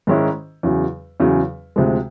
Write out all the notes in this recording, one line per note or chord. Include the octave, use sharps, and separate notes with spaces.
G#2 D#3 G#3 C#4 E4
E2 C#3 F#3
E2 C#3 F#3
D2 C3 F3 G#3